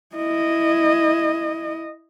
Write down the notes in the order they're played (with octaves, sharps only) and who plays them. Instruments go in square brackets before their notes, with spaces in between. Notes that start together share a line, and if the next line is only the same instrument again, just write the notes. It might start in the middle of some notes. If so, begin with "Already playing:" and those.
[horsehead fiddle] E4 D#5